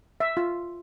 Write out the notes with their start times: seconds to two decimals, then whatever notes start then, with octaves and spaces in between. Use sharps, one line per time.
0.20 E5
0.37 F4